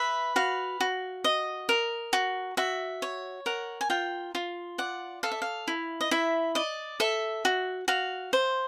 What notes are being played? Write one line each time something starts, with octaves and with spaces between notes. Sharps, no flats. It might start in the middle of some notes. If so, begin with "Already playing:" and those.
Already playing: B4 E5
F#4 F5
F#4
D#5
A#4
F#4
F#4 E5
C#5
A#4 F#5
G#5
F4 G5
F4
D5 F#5
A4 F5
E5
F5
E4
D#5
E4 E5
D5 D#5
A4 E5
F#4
F#4 F5
C5